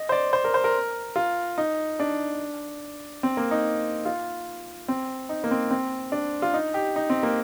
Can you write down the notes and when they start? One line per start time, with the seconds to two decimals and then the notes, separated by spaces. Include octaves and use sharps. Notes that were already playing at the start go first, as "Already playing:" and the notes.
Already playing: D#5
0.09 C5
0.12 D5
0.33 C5
0.44 A#4
0.54 C5
0.64 A#4
1.16 F4
1.58 D#4
2.00 D4
3.23 C4
3.37 A#3
3.51 D#4
4.05 F4
4.88 C4
5.29 D#4
5.44 A#3
5.51 C4
5.71 C4
6.12 D4
6.42 F4
6.54 D#4
6.74 G4
6.96 D#4
7.10 C4
7.23 A#3